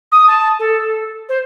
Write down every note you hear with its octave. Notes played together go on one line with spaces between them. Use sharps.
D#6
A5
A4
C5